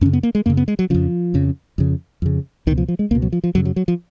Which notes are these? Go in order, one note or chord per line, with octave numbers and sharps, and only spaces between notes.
F#2 C#3 C#4
B3
A#3
G#3
F#2 C#3 A#3
B3
G#3
F#3
F2 C#3 F3
F2 C#3
F2 C#3
F2 C#3
C#2 B2 D#3
F3
F3
G#3
C#2 B2 A#3
F#3
F3
F3
F#2 C#3 F#3
F#3
F#3
F3